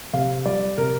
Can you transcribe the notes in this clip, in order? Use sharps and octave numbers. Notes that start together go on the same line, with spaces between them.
C3 F5
G3 D5
C3 A#4